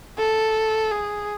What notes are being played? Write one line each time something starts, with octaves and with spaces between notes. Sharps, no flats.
A4
G#4